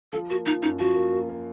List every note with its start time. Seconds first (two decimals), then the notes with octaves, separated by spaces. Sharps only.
0.12 F3 A4
0.30 A#3 F#4
0.46 F3 D#4
0.62 F#2 D#4
0.79 F3 F#4
0.96 A#3
1.12 A#3
1.29 A#3